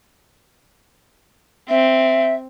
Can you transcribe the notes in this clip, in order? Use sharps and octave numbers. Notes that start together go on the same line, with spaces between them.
C4 E5